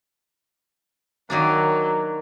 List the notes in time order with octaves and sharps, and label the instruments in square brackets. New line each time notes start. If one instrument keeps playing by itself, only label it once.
[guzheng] D#3 A#3 D4 [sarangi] F#3